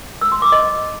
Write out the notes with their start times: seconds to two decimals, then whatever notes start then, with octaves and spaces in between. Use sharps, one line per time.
0.21 E6
0.32 C6
0.42 D6
0.52 D#5